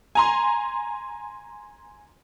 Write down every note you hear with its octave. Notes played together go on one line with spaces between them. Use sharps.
G#5 A#5 C6